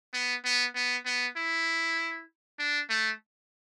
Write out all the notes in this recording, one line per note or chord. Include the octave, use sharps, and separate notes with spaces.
B3
B3
B3
B3
E4
D4
A3